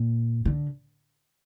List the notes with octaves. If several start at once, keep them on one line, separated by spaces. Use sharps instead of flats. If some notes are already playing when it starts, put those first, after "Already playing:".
Already playing: A#2
D3